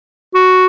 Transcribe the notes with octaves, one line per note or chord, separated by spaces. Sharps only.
F#4